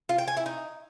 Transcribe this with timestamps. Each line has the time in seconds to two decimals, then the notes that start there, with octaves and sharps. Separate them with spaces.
0.09 F4
0.18 G5
0.28 G#5
0.37 E4
0.46 D#4